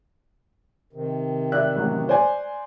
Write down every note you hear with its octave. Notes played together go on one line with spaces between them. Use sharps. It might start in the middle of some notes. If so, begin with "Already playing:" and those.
C3 D#3
D5 E5 F#6
A1 F#3
C5 D5 G#5